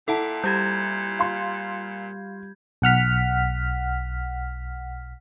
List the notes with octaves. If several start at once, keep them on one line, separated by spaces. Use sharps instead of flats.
A#2 E4 A4 F#5 A5
G3 G4 B5 G6 G#6
F4 C6
B1 F#5 F6 B6